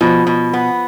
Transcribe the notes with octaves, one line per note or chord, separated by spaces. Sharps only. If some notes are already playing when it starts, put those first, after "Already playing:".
B2 F3
B2
B3